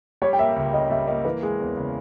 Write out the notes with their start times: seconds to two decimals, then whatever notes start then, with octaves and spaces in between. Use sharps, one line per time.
0.22 G3 C#5
0.33 G5
0.39 A#3 E5
0.56 C#2 E5
0.73 C#3 D#5
0.91 G3 E5
1.08 A#3 D#5
1.25 E3 B4
1.42 G#3 G#4
1.60 E2
1.77 C#3